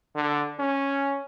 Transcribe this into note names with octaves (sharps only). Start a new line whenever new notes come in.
D3
C#4